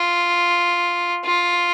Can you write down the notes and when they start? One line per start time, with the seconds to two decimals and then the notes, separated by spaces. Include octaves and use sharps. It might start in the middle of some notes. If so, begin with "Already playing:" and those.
Already playing: F4
1.25 F4